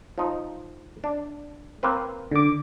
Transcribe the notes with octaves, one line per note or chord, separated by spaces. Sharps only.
F3 D#4
D4
A#3 C4 B4
D3 D6